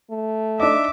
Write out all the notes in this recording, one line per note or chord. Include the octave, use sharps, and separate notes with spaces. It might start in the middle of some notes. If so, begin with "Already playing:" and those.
A3
D4 D#4 D#5 E5 D6